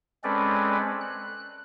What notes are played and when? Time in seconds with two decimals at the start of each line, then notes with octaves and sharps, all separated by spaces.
0.24 G#3 C4 C#4 A4 B4 D5
1.01 F#6